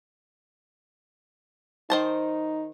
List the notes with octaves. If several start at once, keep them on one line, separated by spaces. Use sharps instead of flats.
D#3 D#4 C5 A5